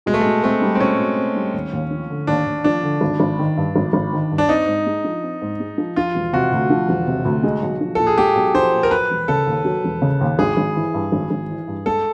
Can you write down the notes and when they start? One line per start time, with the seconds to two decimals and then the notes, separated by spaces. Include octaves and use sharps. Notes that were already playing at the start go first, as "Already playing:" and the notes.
0.06 B2 G#3
0.14 A3
0.21 B2 G#3
0.44 A3 C4
0.62 G3
0.75 C4
0.80 B2 C#4
0.98 B2
1.18 C4
1.36 G3
1.54 D#2
1.73 D#2
1.91 F3
2.10 D3
2.27 D#2 D4
2.46 D#2
2.64 F3 D4
2.83 D3
3.01 G#1
3.20 G#1
3.39 D#3
3.57 G2
3.76 G#1
3.93 G#1
4.13 D#3
4.31 G2
4.38 D4
4.49 C4 D#4
4.67 G#2
4.86 G#3
5.04 F3
5.23 C4
5.42 G#2
5.60 G#3
5.78 F3
5.96 F3 F4
6.15 E1
6.33 C3 F#4
6.52 D2
6.70 F3
6.89 E1
7.07 C3
7.25 D2
7.43 G#3
7.62 B1
7.81 F3
7.95 A#2 A4
8.07 G#4
8.18 G#3 G4
8.35 B1
8.54 F3 C5
8.73 A#2
8.83 A#4
8.91 F#3 B4
9.10 E1
9.28 C#3 A4
9.47 D#2
9.65 F#3
9.84 E1
10.02 C#3
10.21 D#2
10.39 G#1 G#4
10.57 G#1
10.76 E3
10.94 G2
11.12 G#1
11.30 G#1
11.49 E3
11.67 G2
11.86 G#3 A4